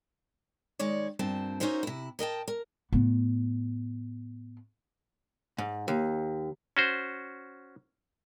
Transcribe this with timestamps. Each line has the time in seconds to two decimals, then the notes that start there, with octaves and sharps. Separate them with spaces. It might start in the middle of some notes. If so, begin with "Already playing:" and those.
0.79 D#3 G#3 C#5 D5
1.19 G2 A#2 C4 A5
1.60 C#4 D#4 F#4 A#4 C5 E5
1.83 C3 E4
2.19 A#4 D#5 G5 A5
2.48 A#4
2.93 A2 B3
5.58 G#2
5.88 D#2
6.77 C#4 F#4 C5